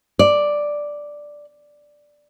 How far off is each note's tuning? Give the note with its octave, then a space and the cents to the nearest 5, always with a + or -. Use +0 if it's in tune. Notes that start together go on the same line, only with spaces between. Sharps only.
D5 +0